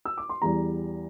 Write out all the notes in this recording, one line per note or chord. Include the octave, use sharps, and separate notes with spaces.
E6
D6
C6
E2 E3 G3 A#5